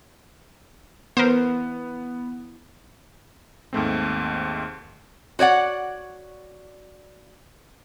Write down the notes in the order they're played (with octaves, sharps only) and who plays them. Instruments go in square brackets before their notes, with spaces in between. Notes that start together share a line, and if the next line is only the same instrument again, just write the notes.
[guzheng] E3 E4 [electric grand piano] B3 [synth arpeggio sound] A#4 C5
[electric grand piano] D#2 G#2 A3 C4
[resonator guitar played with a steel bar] F#4 C#5 D5 F#5